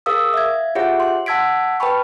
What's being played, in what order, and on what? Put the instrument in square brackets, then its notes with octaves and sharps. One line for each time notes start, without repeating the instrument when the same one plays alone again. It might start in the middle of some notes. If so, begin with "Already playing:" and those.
[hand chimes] G#4 A#4 F5 D#6 E6
E5 F5 G#6
F4 G4 G#4 C#5 E5 F#5
C6
F#5 A5 E6 G#6 B6 D7
B4 G5 A5 B5 C#6